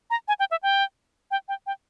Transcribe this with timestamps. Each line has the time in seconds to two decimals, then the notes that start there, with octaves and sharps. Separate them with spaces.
0.10 A#5
0.28 G#5
0.40 G5
0.51 E5
0.63 G5
1.31 G5
1.48 G5
1.67 G5